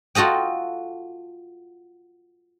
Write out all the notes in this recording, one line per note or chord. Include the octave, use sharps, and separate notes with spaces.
F4 F#4 A4 D#5 G5